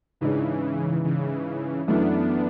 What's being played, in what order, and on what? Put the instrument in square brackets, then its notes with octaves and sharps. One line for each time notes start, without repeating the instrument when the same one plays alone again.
[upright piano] G#2 G#3 D4 G#4 [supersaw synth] C#3 E3
[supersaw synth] C#3 E3
[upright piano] F#2 E3 A3 [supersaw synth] B3 D4